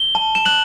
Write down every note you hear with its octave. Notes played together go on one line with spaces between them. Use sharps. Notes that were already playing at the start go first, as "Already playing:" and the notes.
Already playing: G7
A5
E7
F#6 F#7